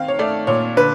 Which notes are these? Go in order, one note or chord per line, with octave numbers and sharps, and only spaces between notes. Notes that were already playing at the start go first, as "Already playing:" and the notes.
Already playing: D#3 C4 F5
C#5
A3 D5
A#2 C#5
D3 B4